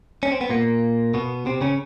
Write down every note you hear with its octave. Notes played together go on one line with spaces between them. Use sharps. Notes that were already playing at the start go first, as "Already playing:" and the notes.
C#4
C4
B3
A#2 A#3
B2 B3
C3 C4
C#3 C#4